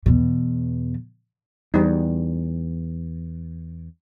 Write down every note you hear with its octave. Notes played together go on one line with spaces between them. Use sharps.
E2 B2
E2 G3 D#4